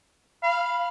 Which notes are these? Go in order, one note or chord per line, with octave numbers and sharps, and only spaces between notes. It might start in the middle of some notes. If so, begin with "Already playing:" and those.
F5 B5